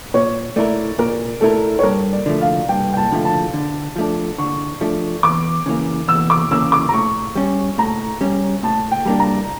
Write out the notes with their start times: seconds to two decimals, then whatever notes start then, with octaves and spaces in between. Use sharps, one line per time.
0.14 A#2 C#5
0.56 A3 E4 A#4 D5
0.98 A#2 A#4
1.41 A3 E4 A4 A#4
1.79 C#5
1.83 G2 A#4
2.13 D5
2.26 D3 F3 A3
2.41 F5
2.69 G2 G5
2.93 G5
2.97 A5
3.12 D3 F3 A3
3.25 A5
3.54 D3
3.96 F3 A3 D4
4.38 D3 C#6
4.81 F3 A3 D4
5.23 E2 D6
5.66 C#3 E3 A#3
6.08 E2 E6
6.30 D6
6.51 C#3 E3 A#3 E6
6.72 D6
6.89 A#5
6.94 A2 C#6
7.35 G3 C#4
7.78 A2 A#5
8.21 G3 C#4
8.63 A2 A5
8.91 G5
9.06 G3 A#3 D4
9.20 A#5